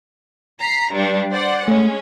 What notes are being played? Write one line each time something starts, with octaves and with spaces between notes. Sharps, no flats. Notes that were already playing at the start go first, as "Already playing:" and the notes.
A#5 B6 C7
G2 G3 D4
C5 D5 F#5
G#3 A3 C#4 C#5